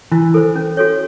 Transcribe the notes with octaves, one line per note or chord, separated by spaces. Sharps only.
E3 E4
A4 C5
C#4
F#4 A4 C#5